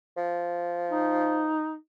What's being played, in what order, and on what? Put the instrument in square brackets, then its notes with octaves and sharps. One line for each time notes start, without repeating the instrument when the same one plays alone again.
[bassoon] F3
[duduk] D#4